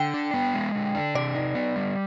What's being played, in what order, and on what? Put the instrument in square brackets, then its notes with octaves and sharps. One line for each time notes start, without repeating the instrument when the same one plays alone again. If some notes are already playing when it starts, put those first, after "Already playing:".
Already playing: [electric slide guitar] D3 [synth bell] G5
[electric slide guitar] D4
B3
G#3
D3
D4
[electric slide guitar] C3 [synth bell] D5
[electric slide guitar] D#4
B3
G3